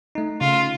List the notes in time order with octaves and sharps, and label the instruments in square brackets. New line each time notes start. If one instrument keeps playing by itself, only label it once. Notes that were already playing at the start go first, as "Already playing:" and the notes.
[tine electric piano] A3 D#4
[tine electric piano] C#3 [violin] F4